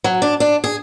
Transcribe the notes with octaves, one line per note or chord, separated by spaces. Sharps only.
F#3
D4
D4
G#4